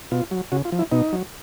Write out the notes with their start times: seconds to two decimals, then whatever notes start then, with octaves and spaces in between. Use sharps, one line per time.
0.11 B2 F4
0.31 F#3
0.52 C#3 F#4
0.65 F4
0.72 F3
0.79 E4
0.92 B2 D#4
1.13 F#3